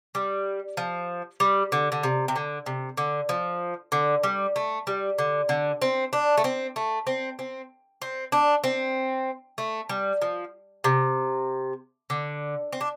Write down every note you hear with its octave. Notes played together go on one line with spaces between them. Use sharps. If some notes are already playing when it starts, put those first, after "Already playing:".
G3
F3
G3
D3
D3
C3
C3
D3
C3
D3
F3
D3
G3
A3
G3
D3
D3
C4
D4
A3
C4
A3
C4
C4
C4
D4
C4
A3
G3
F3
C3
D3
C4
D4